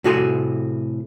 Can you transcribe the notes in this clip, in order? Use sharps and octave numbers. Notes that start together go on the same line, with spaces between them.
A2 C3 F#4 G#4 A4 C6